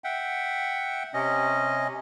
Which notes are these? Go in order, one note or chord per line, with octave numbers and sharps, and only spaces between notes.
E5 F#5 G5
C3 C#4 D#5